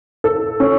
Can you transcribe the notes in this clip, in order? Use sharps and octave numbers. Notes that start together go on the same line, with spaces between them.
A4
C#4